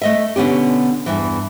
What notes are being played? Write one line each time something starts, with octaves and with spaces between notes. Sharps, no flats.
A3 D#5 E5
B2 D3 B3 C#4 G4
E2 G2 E3